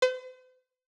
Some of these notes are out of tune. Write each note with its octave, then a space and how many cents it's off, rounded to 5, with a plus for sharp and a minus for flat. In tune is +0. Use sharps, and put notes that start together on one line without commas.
C5 -45